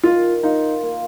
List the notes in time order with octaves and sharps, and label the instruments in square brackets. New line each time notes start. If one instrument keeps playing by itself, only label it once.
[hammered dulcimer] D#3 [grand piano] F4
[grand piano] D#4 [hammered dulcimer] F4
[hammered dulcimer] A#3